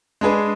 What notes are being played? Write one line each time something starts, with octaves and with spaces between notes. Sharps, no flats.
G#3 D4 G#4 B4